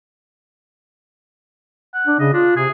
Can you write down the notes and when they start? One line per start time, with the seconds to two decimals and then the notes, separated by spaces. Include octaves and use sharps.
1.94 F#5
2.07 D4
2.20 C#3 D#5
2.34 D4 F4
2.57 C3 G#4